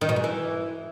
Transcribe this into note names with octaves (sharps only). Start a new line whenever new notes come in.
D#3
B2
G#2
E3